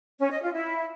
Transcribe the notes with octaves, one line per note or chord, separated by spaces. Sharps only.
C#4
D#5
F4
E4